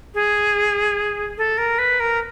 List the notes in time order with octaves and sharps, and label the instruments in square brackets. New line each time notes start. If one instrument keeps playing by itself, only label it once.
[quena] G#4
A4
A#4
B4
A#4